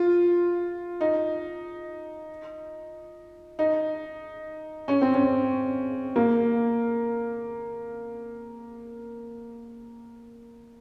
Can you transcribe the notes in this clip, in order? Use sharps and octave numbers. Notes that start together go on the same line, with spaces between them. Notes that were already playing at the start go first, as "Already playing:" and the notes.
Already playing: F4
D#4
D#4
C#4
C4
C#4
A#3